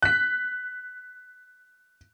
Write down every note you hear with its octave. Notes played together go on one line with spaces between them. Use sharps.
F#6 B6